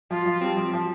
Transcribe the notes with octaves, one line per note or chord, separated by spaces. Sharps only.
F3 F4
F3
G3 C4
F3
F3